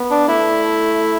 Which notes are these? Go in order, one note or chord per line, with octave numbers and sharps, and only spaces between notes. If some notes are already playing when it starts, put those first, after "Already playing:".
Already playing: B3
D4
A3 E4